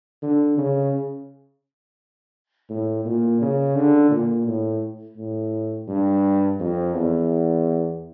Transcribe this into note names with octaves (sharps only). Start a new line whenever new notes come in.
D3
C#3
A2
A#2
C#3
D3
A#2
A2
A2
G2
F2
E2